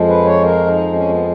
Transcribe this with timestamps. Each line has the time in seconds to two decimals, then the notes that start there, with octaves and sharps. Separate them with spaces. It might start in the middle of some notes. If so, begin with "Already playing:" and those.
Already playing: F2 F3 G#3
0.09 B4
0.25 C#5
0.42 A#4
0.67 D#4
0.93 C#4
1.08 B3